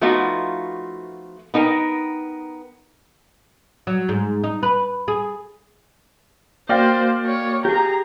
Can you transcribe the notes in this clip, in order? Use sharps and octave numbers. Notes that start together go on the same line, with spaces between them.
F3 A3 B3 D#4 F4 F#4
B3 D#4 A#4 G5
F#3
G#2
D#4
B4
G#4
A#3 F#4 C5 D5 F5 G5 A#6
C#5
G4 G#4 A#5